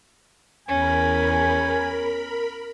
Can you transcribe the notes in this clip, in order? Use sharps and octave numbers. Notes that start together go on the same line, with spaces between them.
E2 C#4 A#4 G#5 B5